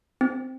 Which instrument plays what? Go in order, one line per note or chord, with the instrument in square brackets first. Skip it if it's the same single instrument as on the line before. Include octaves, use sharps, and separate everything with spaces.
[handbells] C4